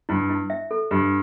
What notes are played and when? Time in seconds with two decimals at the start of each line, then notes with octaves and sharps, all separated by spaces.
0.09 G2 E4
0.29 E4
0.50 E5
0.71 A4
0.91 G2 G4